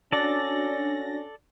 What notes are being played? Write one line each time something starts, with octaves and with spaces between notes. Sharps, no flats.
C#4 D4 F#4 A4 D5 A#6